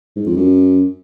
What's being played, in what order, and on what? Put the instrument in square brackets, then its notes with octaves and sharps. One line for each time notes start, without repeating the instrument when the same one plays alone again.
[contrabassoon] G#2
F2
F#2